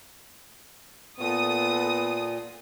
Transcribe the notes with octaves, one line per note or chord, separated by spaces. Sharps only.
A#2 B3 A4 D#6